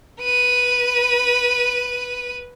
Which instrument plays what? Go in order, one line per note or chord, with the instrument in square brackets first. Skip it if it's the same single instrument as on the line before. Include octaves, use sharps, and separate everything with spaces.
[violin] B4 D#7